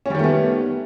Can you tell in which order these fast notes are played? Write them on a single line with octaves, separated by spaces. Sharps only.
C#4 G3 D#3 A3 B3